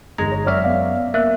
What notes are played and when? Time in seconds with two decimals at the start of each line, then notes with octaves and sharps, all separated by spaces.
0.18 G1 E2 G#3 A#5
0.32 C#5
0.47 F#2 C#5 D5 E5 F6
0.64 B3 D5 F5
1.14 A#3 E5 F#6